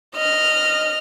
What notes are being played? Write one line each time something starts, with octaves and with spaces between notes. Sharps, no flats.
D#5 F6